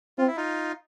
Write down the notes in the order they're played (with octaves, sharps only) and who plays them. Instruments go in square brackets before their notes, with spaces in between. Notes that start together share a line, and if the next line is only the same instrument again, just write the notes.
[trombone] C4 [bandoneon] F4
[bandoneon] E4
D#4 F4